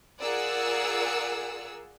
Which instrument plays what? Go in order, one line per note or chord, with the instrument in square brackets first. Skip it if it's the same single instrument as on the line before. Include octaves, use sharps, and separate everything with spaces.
[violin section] F4 G#4 A#4 D5 F#5 E6